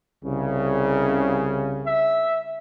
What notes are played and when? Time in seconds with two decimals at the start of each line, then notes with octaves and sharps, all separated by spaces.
0.25 C2 C#3
1.86 E5